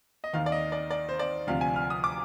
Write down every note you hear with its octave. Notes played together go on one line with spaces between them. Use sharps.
D#5
D#2 D#3 F5
D5
D#5
D5
D5
C5
D5
D2 C3 F3 F5
G#5
F6
D#6
D6